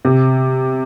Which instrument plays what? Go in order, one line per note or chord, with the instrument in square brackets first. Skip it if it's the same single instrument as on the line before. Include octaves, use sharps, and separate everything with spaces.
[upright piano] C3